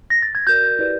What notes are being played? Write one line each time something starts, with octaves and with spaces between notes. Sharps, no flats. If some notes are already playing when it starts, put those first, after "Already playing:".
A#6
A6
G#6
F#4 A#4 D5 G6
E4 G4 B4 D5